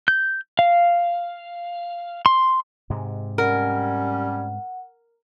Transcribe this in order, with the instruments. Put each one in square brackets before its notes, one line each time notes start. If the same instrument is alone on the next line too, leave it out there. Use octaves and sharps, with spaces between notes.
[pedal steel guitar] G6
F5
C6
[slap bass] G#2 C3 G#3
[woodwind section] G3 C#4 [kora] A#4 [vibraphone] F#5